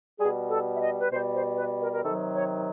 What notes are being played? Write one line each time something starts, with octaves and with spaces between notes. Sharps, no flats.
B2 G3 G#4
A4
E5
D#5
B4
B2 G3 C5
C5
B4
A#4
A#4
C3 D#3 F#3 A4
C#5